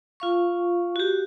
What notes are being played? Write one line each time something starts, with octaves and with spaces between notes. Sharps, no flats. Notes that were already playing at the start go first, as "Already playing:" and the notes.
F4 F5 C#6
F#4 G4